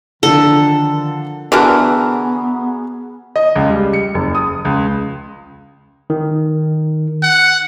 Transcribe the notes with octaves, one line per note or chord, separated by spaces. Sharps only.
D3 D#3 F3 D4 A4
D3 E3 B3 F#4 G#4 A#4
D#5
C#2
G3
C#7
F#1
D#6
C#2
D#3
F#5